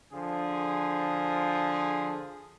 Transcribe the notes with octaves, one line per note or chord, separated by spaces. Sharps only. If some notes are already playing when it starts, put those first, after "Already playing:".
D3 F3 G#4